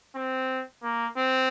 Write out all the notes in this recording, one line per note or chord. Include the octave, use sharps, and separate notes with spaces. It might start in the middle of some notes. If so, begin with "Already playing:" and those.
C4
A#3
C4